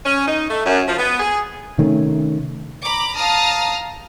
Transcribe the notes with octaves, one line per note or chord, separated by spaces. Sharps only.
C#4
D#4
A3
F#2
F3
B3
G#4
C3 D#3 A3 C#4
A#5 B5 D6
F5 A5 A#5 D#6 F6